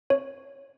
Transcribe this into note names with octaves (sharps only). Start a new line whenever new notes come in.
C#5